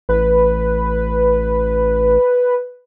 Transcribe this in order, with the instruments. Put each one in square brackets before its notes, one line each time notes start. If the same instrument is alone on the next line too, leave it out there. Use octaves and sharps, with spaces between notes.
[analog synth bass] A1 [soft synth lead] B4